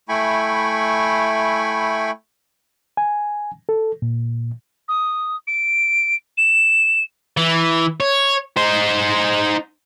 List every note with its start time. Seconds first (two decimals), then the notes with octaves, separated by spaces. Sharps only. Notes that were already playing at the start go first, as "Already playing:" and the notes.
0.09 A3 E4 G5 G#5 B5 C#6
2.97 G#5
3.69 A4
4.02 A#2
4.88 D#6
5.47 D7
6.38 E7
7.37 E3
8.00 C#5
8.57 D#4 C5